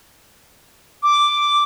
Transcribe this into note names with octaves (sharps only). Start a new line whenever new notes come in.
D6